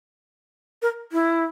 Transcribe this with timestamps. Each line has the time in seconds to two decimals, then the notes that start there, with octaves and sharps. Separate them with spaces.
0.82 A#4
1.12 E4